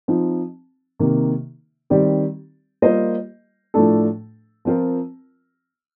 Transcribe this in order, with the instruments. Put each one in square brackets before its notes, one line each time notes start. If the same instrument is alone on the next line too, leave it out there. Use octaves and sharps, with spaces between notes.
[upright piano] F3 C4 D#4
C3 D#3 A#3
D#3 G3 C4 G4 D5
G3 A#3 F4 C5 D#5
A2 F3 A3 D4 A4
F3 C4 F4 A#4